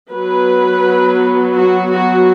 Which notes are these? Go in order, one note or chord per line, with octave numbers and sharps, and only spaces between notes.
F#3 B3 B4
F#4
F#4